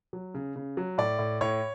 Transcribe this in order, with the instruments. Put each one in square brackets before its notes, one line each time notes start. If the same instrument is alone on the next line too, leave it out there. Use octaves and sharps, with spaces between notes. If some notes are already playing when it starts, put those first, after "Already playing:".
[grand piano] F#3
C#3
C#3
F#3
A2 D5
A2
A2 C#5